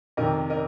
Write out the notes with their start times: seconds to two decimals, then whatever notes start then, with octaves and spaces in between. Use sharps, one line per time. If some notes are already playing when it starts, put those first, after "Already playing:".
0.17 F2 C3 D#3 A#4 D#5
0.50 A#4 D#5